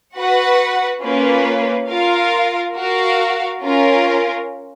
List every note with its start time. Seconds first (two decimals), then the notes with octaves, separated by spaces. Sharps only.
0.17 F#4 B4 F#5
1.03 A#3 C#4 F4 B4
1.90 F4 A#4 F5
2.76 F#4 A#4 F5
3.62 C#4 F4 A#4